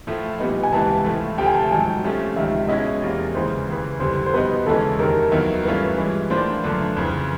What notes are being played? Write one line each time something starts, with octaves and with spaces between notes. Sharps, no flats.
A2 F3 A3
A#2 G3 B3 D#4
G#5
C#2 C3 E3 A5
A2 F3 A3
D2 C3 F3 A3 G5
G#5
A5
G#2 D#3 F#3 G#5
C3 F3 A3 C#4
C#2 C3 D#3 E5
B2 G#3 C#4 E4 D#5
E2 C3 F3 A#3
D#2 C#3 E3 G#3 C5
D#2 C#3 E3
F2 D3 G3 C5
C5
B2 G3 B3 D#4 B4
D#2 C#3 E3 G#3 C#4 A4
F2 C3 D#3 A#4
D#2 D#3 F#3 B3 E4
G2 E3 A3 C#4 F4 B4
G2 E3 G#3
A2 F3 A#3 D4 C5
F#2 D3 F3 A3 D4
F2 C#3 E3